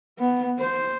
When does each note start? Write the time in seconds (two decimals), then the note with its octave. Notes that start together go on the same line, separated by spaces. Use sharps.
0.19 B3
0.59 C5